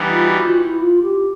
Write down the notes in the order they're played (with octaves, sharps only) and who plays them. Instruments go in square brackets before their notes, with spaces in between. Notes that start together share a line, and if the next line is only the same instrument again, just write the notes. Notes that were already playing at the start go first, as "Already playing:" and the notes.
Already playing: [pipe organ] E3 G3 B3 D#4
[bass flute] F4
F#4
F4
E4
F4
G4